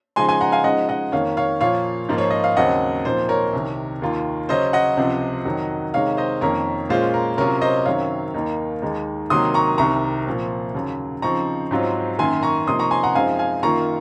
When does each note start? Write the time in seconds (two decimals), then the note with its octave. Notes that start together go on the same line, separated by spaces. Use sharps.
0.16 C#3 F3 G#3 D#4 G#5 C6
0.29 G#5 C6
0.41 F#5 A#5
0.52 F5 G#5
0.64 C#3 F3 G#3 D#4 D#5 F#5
0.89 D#5 F#5
1.12 F2 D#3 A#3 C#5 F5
1.37 C#5 F5
1.61 A#2 F3 A#3 F4 C#5 F5
2.09 G#2 F3 A#3 F4
2.18 C#5
2.30 D#5
2.44 F5
2.57 D#2 C#3 F#3 C4 D#5 F#5
3.05 A#2 F3 C4 D#4 C5
3.29 A#4 C#5
3.53 C2 C3 D#3
4.02 D#2 D#3 A#3 F4
4.49 C#3 F#3 C#4 C5 D#5
4.73 D#5 F#5
4.97 C#2 C3 F3 C4
5.45 F2 D#3 F#3
5.94 C3 D#3 G#3 D#4 C#5 F5
6.17 C5 D#5
6.41 F2 D#3 A#3 C#4 A#4 C#5
6.89 A#2 G#3 C#4 F4 C5
7.14 A#4
7.37 C3 F#3 C#4 F4 A#4 C#5
7.62 C5 D#5
7.86 F#2 D#3 F#3 C4 C#5 F5
8.34 D#2 D#3 A#3 D#4
8.82 D#2 D#3 G#3 D#4
9.30 C3 D#3 F#3 A#3 C6 D#6
9.54 A#5 C#6
9.78 C2 C3 D#3 A#5 C#6
10.26 A#2 F3 C4
10.74 D#2 C#3 F#3
11.22 C#3 F3 C4 D#4 A#5 C#6
11.71 G#2 F#3 C4 F4
12.18 F#2 D#3 A#3 G#5 C6
12.43 A#5 C#6
12.67 C3 F3 A#3 D#4 C6 D#6
12.79 A#5 C#6
12.91 G#5 C6
13.03 F#5 A#5
13.15 F#2 F3 G#3 C4 D#4 F5 G#5
13.39 F5 G#5
13.63 F#2 D#3 A#3 F4 A#5 C#6